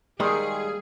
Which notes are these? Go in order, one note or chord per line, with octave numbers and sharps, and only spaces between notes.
D#3 G3 G#3 A#3 G#4